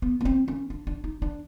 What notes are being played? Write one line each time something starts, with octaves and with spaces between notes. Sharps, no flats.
B3
B3
C4
C#4
D4
D4
D#4
D4